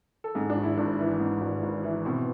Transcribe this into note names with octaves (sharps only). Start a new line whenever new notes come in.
A4
G#2 G#4
D4
G#1
E4
G#1 D4
E3
G#2
G#1
G#1
E3
B2 C4